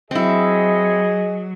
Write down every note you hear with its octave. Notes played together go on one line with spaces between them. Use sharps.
F#3 C4 E4 G#4 D#5